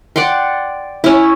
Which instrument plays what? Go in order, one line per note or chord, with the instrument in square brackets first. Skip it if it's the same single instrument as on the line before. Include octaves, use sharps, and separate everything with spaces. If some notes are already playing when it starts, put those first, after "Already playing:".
[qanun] D5 F#5 G5 C6
C#4 E4